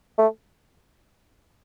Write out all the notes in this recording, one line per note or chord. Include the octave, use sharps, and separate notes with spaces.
A3